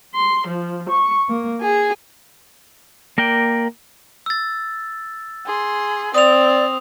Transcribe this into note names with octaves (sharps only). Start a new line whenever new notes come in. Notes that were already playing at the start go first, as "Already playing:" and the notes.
C6
F3
C#6
A#3
G#4
A#3 A#4 D5 G5
E6 A6
G#4 C6
C4 D5 D#6 F7